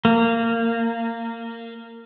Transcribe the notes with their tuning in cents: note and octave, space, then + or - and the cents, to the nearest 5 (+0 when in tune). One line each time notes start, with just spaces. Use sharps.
A#3 -20